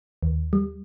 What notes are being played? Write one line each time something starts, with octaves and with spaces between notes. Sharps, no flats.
D#2
G3